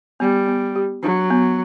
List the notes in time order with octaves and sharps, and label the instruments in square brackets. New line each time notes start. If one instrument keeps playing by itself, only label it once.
[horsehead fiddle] G3 [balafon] B3
[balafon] B3
G4
[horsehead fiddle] F#3 [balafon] D4
[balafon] B3